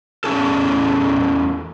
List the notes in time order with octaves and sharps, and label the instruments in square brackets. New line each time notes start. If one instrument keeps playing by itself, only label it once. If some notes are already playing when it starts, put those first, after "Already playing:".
[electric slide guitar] E2 C#4 G#4 A4